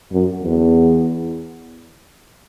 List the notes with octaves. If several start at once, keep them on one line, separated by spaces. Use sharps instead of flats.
F#2
E2